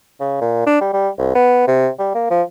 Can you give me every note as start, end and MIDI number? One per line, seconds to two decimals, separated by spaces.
0.20 0.37 49
0.41 0.62 46
0.66 0.79 62
0.81 0.88 55
0.93 1.09 55
1.18 1.31 36
1.35 1.65 59
1.67 1.89 48
1.99 2.14 55
2.14 2.26 58
2.30 2.42 53